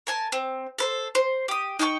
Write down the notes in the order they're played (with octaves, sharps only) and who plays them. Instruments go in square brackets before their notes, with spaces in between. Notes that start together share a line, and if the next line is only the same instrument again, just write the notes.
[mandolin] A#4 G#5 A5
C4
A4 B4 C5
C5
G4 D#6
D#4 G5 G#5 C#6